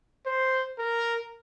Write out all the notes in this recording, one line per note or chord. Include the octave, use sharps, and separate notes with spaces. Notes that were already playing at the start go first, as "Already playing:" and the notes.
C5
A#4